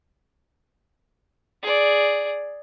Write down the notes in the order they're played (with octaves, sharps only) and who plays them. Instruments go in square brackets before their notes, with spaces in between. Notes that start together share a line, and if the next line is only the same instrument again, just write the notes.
[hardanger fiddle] G#4 D5